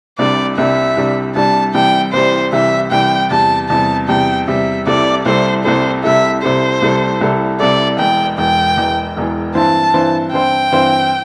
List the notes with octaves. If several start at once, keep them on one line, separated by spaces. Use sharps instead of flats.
C2 C3 G3 D4 D5
C2 C3 G3 D4 E5
C2 C3 G3 D4
C2 C3 G3 D4 A5
C2 C3 E3 G3 G5
C2 C3 E3 G3 C5
C2 C3 E3 G3 E5
C2 C3 E3 G3 G5
E2 C3 G3 A5
E2 C3 G3 A5
E2 C3 G3 G5
E2 C3 G3 E5
C2 C3 G3 E4 A4 D5
C2 C3 G3 E4 A4 C5
C2 C3 G3 E4 A4 C5
C2 C3 G3 E4 A4 E5
C2 C3 G3 E4 A4 C5
C2 C3 G3 E4 A4
C2 C3 G3 E4 A4
C2 C3 G3 E4 A4 D5
E1 E2 E3 G5
E1 E2 E3 G5
E1 E2 E3
E1 E2 E3
G2 E3 C4 E4 C5 A5
G2 E3 C4 E4 C5
G2 E3 C4 E4 C5 G5
G2 E3 C4 E4 C5